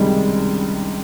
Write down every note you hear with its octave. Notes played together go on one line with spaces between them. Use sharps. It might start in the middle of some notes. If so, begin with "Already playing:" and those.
Already playing: C#2 C3 D#3 G3 G#3